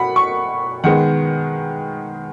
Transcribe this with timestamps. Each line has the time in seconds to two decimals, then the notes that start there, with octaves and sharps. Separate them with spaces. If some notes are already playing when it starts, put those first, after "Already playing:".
Already playing: B2 F#5 B5
0.16 C#6
0.84 D#3 G#3 B3 F#5